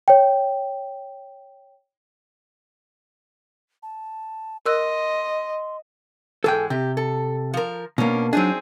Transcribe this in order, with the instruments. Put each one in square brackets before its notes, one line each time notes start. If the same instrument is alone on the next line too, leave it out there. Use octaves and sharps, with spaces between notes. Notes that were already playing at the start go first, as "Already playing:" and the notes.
[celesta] C#5 G5
[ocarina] A5
[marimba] A#4 E6 F#6 [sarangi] D#5 [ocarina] C6
[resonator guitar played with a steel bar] G#2 E3 G#3 [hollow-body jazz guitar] A4 G5
[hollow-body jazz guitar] C3 [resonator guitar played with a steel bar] G4
[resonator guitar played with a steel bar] A4
F3 A#4
[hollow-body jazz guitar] B2 A#3 [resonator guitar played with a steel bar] C#4 D4
[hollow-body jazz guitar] F#3 D4 [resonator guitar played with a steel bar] C4 D#4 G#4